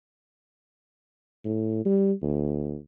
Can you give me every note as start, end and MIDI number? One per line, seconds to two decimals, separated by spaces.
1.44 1.81 45
1.85 2.12 55
2.22 2.76 38